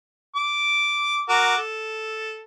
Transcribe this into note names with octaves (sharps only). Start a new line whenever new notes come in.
D6
F#4 A#4 D6
A4